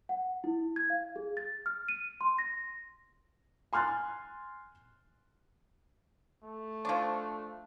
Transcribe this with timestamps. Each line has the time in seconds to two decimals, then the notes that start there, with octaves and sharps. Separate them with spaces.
0.09 F#5
0.44 E4
0.76 G#6
0.90 F5
1.16 G#4
1.37 A6
1.66 F6
1.89 D#7
2.21 C6
2.39 A#6
3.73 G#5 C6 F6 F#6 A6
6.44 A3
6.85 F3 D4 F5 C6 C#6